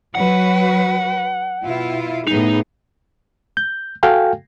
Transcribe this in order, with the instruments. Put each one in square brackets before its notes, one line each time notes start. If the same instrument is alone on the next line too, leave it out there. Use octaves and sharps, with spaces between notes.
[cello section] F#3 F#4 B4 [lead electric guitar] F#5
[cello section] B2 E4 F4
[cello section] A2 B3 G#4 [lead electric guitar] D#4
[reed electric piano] G6
F#4 A4 F5 G5 G#5